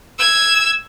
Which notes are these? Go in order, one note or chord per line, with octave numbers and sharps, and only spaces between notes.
E6 G#6